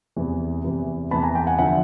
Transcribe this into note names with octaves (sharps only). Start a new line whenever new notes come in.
E2 C3 E3
E2 C3 E3
E2 C3 E3 A5 B5
G#5 A#5
G5 A5
F#5 G#5
D3 F3 E5 F#5